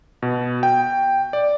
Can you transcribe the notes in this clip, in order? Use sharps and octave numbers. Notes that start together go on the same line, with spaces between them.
B2
G5
D5